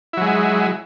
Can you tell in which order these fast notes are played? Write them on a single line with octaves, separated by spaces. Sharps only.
E4 F#3 G#3